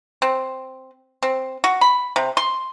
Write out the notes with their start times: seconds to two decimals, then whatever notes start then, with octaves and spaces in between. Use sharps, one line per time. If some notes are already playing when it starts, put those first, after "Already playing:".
0.22 C4
1.23 C4
1.64 F#4
1.81 B5
2.16 C3
2.37 C6